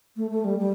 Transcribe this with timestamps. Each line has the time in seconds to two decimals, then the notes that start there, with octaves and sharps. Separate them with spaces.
0.17 A3
0.31 A3
0.44 G3
0.59 G3